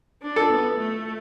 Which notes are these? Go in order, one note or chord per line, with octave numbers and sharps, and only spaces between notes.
D4
A4
B3
A3